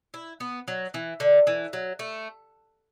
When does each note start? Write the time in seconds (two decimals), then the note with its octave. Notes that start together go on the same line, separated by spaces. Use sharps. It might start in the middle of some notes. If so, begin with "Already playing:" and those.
0.14 E4
0.40 B3
0.68 F#3
0.94 E3
1.20 D3
1.47 E3
1.73 F#3
1.99 A3